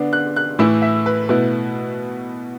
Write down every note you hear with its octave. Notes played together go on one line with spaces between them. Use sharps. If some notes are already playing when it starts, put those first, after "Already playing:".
Already playing: D3 B3 D4
F#6
F#6
A2 E3 A3 E4 E6
E5
B4
B2 A3 E4 B4